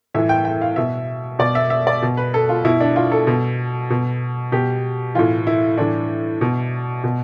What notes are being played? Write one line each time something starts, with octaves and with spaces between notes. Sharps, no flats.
A2 E3 E5
G5
G5
F5
B2 E5
B2 D5
E5
E5
D5
B2
B4
A4
F4
B2 E4
D4
F4
A4
B2
B2
B2 G4
A2 E3 F4
E4
A2 E3 D4
B2
B2